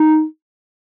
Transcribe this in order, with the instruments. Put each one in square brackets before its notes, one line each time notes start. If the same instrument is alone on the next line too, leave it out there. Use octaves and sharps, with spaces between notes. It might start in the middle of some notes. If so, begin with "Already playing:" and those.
Already playing: [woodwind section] D#4